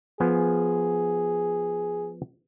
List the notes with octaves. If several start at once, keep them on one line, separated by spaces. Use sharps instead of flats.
F3 B3 G#4 G#5